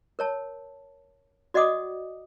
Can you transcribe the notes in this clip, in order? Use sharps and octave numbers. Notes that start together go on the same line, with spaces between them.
A#4 C#5 A5
F#4 D5 D#5 F#5 D6 D#6